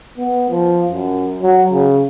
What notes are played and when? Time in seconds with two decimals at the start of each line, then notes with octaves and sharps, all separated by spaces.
0.18 B3
0.50 F3
0.91 F#2
1.43 F#3
1.72 C#3